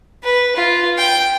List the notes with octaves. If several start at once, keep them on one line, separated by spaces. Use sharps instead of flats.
B4
F4
G5